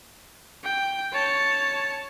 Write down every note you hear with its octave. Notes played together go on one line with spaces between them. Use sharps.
G5
C#5 A5